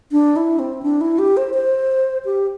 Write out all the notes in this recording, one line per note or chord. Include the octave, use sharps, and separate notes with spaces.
D4
E4
C4
D4
E4
G4
C5
C5
G4